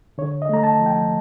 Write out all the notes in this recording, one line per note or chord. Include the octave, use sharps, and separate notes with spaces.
D3 C#5
D#5
A3 A#5
A5
F3
G5